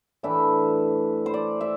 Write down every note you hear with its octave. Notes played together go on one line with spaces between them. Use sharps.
A2 E3 A3 D4 E5
C5
D5
E5